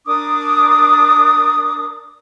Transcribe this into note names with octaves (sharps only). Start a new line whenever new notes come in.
D4 A#4 D6 D#6